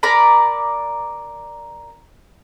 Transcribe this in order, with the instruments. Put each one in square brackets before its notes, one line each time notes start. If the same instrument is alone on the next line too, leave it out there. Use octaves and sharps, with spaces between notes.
[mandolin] A#4 D5 A#5 B5